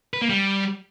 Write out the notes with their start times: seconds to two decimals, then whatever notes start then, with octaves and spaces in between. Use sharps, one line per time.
0.14 B4
0.22 A#3
0.30 G3